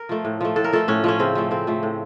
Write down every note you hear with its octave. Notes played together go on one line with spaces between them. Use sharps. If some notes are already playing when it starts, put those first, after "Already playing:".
Already playing: A#4
F3 A3
A2
F3 A3
A2 A4
A#4
F3 A3 A4
A2 C#4
F3 A3 C#4
C#3 C4
F3 A3
C#3 C4
F3 A3
A2